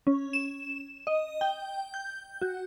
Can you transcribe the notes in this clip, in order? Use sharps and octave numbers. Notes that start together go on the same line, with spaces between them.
C#4
E7
D#5
G5
G6
F#4